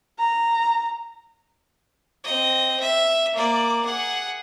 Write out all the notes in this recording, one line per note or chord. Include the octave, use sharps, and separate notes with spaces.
A#5
C4 D#5
E5
A#3 D5
G#4 F#5